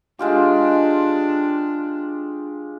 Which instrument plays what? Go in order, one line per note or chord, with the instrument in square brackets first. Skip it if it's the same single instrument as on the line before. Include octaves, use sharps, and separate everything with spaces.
[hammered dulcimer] G#3 F4 G4 [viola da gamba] D4